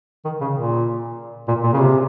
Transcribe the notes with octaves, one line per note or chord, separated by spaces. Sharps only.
D#3
C#3
A#2
A#2
A#2
C#3
C3